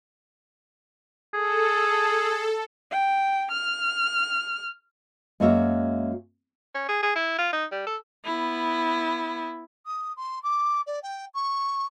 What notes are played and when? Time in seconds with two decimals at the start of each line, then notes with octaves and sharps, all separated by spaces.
1.34 G#4 A4
2.91 G5
3.51 F6
5.40 F#2 G#3 A#3 F#4 C#5 E5
6.74 C#4
6.88 G#4
7.02 G#4
7.15 E4
7.38 F4
7.53 D#4
7.71 G3
7.86 A4
8.25 B3 E4
9.86 D#6
10.17 C6
10.43 D6
10.87 D5
11.03 G5
11.35 C#6